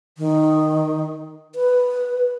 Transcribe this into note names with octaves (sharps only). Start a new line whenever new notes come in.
D#3
B4